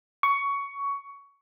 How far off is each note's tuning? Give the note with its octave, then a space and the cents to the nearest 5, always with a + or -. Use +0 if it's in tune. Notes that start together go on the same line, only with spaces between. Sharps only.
C#6 +15